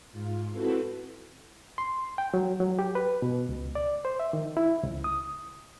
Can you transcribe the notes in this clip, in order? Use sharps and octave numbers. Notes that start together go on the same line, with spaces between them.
G#2 F4
C4 E4 F#4 A4 B4
C6
G5
F#3
F#3
G4
B4
B2
C#2
D5
C5
E5
D#3
E4
C#2
D#6